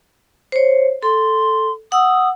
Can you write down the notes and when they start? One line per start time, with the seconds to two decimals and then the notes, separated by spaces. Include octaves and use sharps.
0.52 C5 C#5
1.03 A4 C6
1.92 F#5 D#6 E6